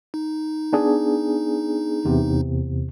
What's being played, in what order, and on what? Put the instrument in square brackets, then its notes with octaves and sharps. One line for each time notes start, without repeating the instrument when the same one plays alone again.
[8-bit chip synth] D#4
[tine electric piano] B3 D4 G#4
E2 C3